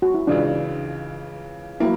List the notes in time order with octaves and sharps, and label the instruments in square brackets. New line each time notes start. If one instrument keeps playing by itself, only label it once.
[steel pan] F#4
E4
[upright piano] C#2 C#3 E3 [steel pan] D4
[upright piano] F#3 A#3 [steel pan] E4